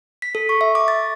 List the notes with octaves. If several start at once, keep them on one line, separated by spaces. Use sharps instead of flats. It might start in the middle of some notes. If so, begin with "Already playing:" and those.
B6
A4
C#6
E5
D6
A6